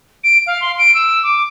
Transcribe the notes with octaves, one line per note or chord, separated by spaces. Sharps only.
D7
F5
C6
D7
E6
D6